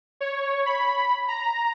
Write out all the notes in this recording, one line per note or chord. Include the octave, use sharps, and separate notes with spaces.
C#5
B5
A#5